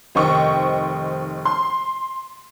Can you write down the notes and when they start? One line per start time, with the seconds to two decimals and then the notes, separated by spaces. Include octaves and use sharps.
0.15 F1 D#3 C5 D#5 G5 C#6
1.45 C6